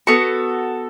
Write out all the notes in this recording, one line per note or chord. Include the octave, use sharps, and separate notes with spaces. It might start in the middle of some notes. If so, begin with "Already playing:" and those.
B3 F#4 A4 C#6